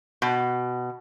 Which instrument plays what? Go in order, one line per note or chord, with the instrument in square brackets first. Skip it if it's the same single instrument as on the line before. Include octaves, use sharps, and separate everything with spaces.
[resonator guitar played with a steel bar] B2